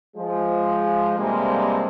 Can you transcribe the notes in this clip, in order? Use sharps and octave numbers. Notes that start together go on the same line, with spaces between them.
F3 G#3
G2 C3 G3 G#3 A#3 C4